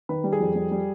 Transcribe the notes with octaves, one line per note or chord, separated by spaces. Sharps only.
D#3 B4
G3
G#4
F2
G3
G3